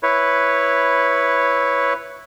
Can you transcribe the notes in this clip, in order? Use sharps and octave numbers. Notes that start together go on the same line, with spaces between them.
E4 B4 C#5